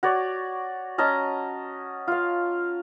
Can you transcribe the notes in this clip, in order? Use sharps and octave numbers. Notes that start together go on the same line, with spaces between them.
F#4 C#5 D5
C#4 D#5 A5 A#5
F4 F5